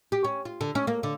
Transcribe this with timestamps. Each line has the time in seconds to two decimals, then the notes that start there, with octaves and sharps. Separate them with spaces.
0.12 G4
0.24 C#4
0.45 F4
0.61 D3
0.75 C#4
0.87 A#3
1.03 D3